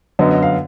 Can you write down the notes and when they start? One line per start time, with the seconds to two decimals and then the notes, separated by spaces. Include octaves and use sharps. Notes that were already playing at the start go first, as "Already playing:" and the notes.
0.19 F#2 D3 F#3 B3 D#5
0.31 D#5
0.43 F5